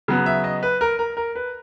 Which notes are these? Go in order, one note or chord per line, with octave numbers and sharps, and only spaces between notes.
C#3 F#3 B3
E5
D#5
B4
A#4
A#4
A#4
B4